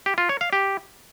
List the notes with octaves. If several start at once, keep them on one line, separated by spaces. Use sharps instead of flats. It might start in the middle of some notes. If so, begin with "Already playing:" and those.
G4
F4
C#5
F5
G4